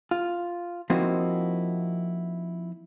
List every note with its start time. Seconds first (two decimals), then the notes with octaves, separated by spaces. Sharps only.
0.11 F4
0.90 F3 A#3 C4 D#4 E4 F#4